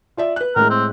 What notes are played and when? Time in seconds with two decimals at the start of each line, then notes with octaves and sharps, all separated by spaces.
0.17 F4 D5 E5
0.36 B4 F#6
0.56 A2 G#3 A#4
0.70 C4